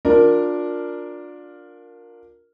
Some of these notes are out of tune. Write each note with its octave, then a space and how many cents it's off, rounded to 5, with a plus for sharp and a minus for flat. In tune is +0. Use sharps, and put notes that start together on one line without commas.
D4 +0 F4 +30 A#4 +0